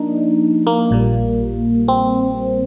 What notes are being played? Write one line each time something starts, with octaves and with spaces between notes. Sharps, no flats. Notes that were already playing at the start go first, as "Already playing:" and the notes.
Already playing: F3 A#3 D4 D#4
A#3
A#1 A#2 G3
C4